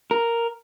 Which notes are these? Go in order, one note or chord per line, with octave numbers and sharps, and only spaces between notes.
A#4